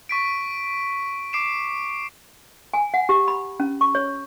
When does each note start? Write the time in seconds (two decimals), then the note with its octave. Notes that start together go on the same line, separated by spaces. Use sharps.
0.09 C#6 B6 D7
1.33 D6 C7 D7 E7
2.73 G#5
2.94 F#5
3.09 G4
3.28 B5
3.60 C#4
3.81 C#6
3.95 C#5